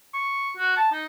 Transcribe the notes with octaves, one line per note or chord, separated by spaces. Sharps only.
C#6
F#4
A5
D#4